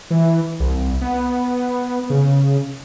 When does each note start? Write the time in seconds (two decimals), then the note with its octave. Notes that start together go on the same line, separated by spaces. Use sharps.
0.10 E3
0.60 C2
1.01 B3
2.10 C#3